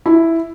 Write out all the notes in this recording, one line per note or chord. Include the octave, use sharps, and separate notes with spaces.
E4